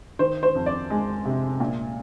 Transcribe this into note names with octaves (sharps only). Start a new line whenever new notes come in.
D#3 C5
C5
F2
D5
G#3
C3
A#2